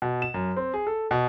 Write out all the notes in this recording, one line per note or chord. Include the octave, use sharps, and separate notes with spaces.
B2
E7
F#2
C4
G#4
A4
B2